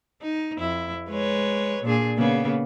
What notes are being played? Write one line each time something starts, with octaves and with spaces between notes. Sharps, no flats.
D#4
F2 E4
G#3 B4 C#5
A#2 D4 G#4
C#3 A#3 B3